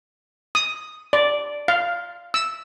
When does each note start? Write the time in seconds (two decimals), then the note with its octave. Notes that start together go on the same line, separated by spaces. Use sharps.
0.55 D#6
1.13 D5
1.68 F5
2.34 E6